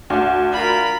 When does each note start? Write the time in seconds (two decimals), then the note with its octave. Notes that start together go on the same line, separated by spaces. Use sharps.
0.10 D2 D4 F#5
0.53 F4 A#4 B5